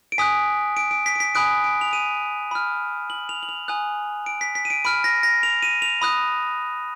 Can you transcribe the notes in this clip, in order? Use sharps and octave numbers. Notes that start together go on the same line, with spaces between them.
D7
G#5 D#6 F#6 B6
D7
D7
B6
D7
B6
G#5 B5 D#6 F#6 D7
D7
F7
D#7
B5 F6
F#7
F7
F#7
F7
G#5 D#6 F#6
D7
B6
B6
D#7
D7
B5 F6 D7
A#6
A#6
F7
D#7
F7
B5 D#6 F#6